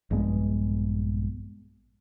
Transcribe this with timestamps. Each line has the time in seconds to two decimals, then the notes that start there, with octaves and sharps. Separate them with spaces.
0.11 A#1 G2 G#3 B3